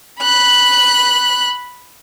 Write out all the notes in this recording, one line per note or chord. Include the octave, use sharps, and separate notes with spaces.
B5 F#6